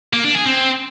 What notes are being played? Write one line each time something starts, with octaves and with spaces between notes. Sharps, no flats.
A#3
D4
G#4
C4